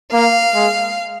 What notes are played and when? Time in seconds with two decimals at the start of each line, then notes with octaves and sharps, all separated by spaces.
0.12 A#3 F5
0.55 G#3